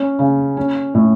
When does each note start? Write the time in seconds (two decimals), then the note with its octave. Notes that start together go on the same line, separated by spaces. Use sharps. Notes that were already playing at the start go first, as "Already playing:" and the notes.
Already playing: C#4
0.19 C#3
0.57 C#4
0.94 A2